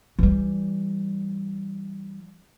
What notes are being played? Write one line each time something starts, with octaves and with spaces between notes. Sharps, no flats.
E3 G3